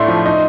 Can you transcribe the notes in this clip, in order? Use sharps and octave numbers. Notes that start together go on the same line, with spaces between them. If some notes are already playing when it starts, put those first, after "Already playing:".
Already playing: A2 A3 D4 C6
F3
D#4